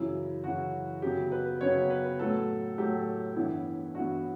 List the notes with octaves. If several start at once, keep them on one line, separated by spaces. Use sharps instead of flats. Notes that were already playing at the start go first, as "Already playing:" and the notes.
Already playing: F#2 C#3 E3 E4
F#2 C#3 E3 F#4
F#2 C#3 F#3 B3 G4
B4
F#2 C#3 F#3 B3 C#5
B4
A2 F#3 A3 A4
A2 F#3 A3 G4
G2 E3 B3 E4
G2 E3 B3 F#4